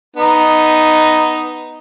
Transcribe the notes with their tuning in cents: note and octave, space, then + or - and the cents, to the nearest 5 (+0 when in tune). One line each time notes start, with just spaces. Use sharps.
B3 +5 D#4 +0